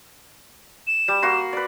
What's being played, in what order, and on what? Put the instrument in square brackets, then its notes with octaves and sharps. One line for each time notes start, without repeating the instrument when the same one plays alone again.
[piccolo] E7
[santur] G3
A#3 F#4 C6
B4 D5